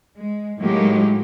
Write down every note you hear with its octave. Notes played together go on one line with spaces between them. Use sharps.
G#3
A2 F#3 G#3 A#3 D#4 G4